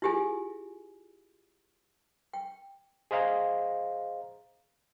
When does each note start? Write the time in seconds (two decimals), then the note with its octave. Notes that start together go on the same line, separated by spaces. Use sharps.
0.02 E4 F4 G4 G#4 G#5
2.33 G5
3.11 G#4 C5 D#5 F5 A#5